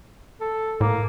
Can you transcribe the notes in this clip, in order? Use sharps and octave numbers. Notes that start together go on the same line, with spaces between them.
A4
A2 A#3